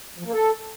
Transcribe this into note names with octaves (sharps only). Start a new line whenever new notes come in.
F3
A#3
A4